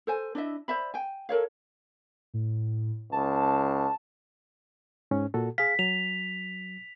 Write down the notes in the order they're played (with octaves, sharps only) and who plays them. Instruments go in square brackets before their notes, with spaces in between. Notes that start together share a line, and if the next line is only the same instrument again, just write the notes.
[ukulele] A4 C5 G#5
D4 E4 D#5 E5
C5 D5 E5 B5
G5 G#5
A4 A#4 C#5 F5
[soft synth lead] A2
[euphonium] C#2 [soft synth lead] A5
[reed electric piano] G#2 C#4
A#2 F#4 A4
[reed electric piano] G#4 F5 [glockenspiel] B6
[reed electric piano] F#3 [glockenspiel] F7